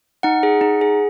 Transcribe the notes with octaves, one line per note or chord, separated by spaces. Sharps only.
D#4 F#5
G#4
D#4
G#4